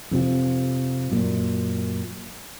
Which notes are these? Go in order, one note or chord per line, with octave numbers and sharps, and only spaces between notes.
F2 C3 F3
F#2 A#2